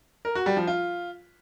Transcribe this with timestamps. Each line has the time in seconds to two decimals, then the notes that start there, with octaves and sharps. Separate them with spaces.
0.25 A#4
0.35 F#4
0.46 G3
0.57 F3
0.67 F4